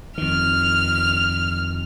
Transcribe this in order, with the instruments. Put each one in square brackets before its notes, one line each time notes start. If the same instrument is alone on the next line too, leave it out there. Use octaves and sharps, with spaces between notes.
[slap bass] F2 D#3 [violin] F6